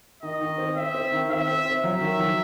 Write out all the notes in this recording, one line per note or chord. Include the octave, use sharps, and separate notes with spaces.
D#3 D#5
D#3
C4
C4 E5
C4
D#3
C4 E5
C4
C4
F#3 E5
D#3
F#3